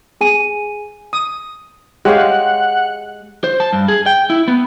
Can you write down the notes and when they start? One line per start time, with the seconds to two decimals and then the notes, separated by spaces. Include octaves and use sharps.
0.21 G#4 G#5 D#7
1.13 D#6
2.05 G#3 G4 C#5 F5 F#5
3.44 C5
3.60 A5
3.73 G2
3.88 G#4
4.06 G5
4.30 E4
4.48 B3